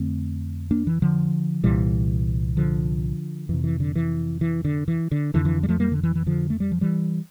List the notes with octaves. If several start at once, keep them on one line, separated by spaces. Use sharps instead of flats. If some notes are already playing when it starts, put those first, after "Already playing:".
Already playing: F2 D3 A3 C4
A#3 D4
E3
D3 F3
C2 A#2 E3 G3
D3 F3
F2 C3 E3
E3
D3
E3
E3
D3
E3
D3
F2 D3 E3
E3
G3
F3 A3
G3 A#3
D3
E3
E3
D3 F3
A3
G3
F3
E3 G3